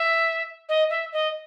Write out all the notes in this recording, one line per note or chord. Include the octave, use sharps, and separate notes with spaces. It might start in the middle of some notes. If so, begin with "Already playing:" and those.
Already playing: E5
D#5
E5
D#5